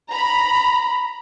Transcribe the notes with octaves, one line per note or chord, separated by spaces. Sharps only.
A#5 B5